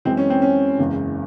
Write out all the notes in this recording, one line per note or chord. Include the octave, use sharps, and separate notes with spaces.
F#2 E3 G#3 C4
C#4
C4
C#4
F#1 E2 C#3 G#3